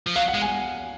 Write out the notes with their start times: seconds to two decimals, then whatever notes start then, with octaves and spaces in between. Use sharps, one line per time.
0.07 F3
0.16 F#3 F5
0.28 F#5
0.34 G#3
0.41 G#5